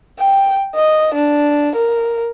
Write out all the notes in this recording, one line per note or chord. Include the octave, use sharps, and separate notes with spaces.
G5
D#5
D4
A#4